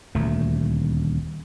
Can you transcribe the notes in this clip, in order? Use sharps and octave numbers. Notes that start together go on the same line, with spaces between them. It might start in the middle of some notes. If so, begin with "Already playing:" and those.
D#1 D2 A3